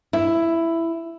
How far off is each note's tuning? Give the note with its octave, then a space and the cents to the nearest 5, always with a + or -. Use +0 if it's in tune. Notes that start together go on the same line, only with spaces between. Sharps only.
E4 +10